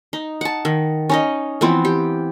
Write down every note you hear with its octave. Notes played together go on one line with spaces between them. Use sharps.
D#4
F#5 A5
D#3
C#4 D#4 D#5
E3 F3 B3 C4
G4